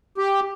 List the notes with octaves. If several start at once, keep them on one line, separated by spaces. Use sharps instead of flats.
G4